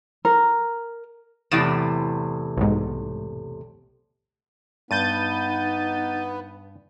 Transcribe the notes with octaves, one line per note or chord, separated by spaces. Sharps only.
A#4
E2 A2 C3 D#6 A6 E7
B1 G#2
G2 B3 D#4 G6 A6 D#7